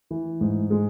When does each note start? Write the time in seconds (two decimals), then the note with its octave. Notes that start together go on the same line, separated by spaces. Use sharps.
0.11 E3
0.41 G#2
0.70 G#3